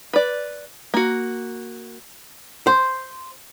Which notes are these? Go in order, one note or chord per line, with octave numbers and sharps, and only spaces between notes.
B4 D5
A#3 F#4
C5